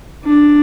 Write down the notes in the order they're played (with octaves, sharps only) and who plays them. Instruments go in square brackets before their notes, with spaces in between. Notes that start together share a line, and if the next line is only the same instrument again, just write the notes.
[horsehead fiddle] D4